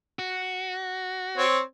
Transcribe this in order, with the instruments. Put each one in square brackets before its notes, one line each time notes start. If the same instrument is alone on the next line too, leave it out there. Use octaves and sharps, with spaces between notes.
[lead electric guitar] F#4
[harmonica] C4 C#5